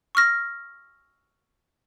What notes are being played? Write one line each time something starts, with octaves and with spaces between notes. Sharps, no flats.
C#6 E6 F6 A#6